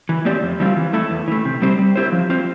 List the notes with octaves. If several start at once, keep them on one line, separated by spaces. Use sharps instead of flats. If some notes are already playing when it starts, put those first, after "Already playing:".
E3
A3 C4 G4 D5
F2
E3 G3 C4 F4
E3
A3 E4 A4
E2
E3 A3
C3
G3 C4 G4 C5
G3
C4 E4 G4 C5
F3
C4 F4 C5